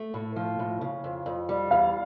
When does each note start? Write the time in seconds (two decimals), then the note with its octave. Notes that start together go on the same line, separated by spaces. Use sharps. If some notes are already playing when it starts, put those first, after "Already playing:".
Already playing: A3
0.14 A2
0.36 F3
0.59 A2
0.81 C#3
1.04 F2
1.26 F2
1.49 G3
1.71 E2 F5